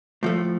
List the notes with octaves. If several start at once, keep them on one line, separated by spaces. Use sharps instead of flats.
A2 F3 A3